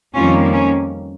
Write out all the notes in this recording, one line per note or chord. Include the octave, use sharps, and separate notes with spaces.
F2 D#3 G3 A#3 C#4 F4
C#4